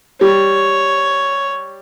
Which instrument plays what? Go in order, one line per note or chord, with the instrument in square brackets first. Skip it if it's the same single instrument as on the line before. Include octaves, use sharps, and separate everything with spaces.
[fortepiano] G3 [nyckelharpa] C#5